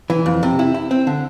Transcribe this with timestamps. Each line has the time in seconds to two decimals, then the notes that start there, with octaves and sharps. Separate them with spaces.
0.10 E3
0.26 F2
0.43 C3
0.59 E4
0.74 E4
0.91 C4
1.07 D3